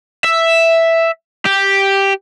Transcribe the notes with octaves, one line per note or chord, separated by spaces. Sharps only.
E5
G4